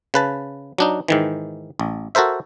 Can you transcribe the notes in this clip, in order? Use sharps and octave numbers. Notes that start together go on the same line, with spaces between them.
C#3 B4 A5
F#3 D4 D#4
G#2 D#3 E3
A1
F#4 A4 A#4 C5 E5